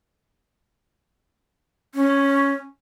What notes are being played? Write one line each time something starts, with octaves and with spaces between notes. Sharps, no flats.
C#4